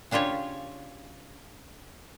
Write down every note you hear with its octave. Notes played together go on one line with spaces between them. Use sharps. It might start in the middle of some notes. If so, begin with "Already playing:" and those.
C#3 D4 F4 G4 C#5